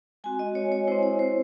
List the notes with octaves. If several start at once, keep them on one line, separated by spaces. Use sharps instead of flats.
G#3 C4 F#4 G#5
D#5
C#5
C#5
C4 E4 C5
C#5
C5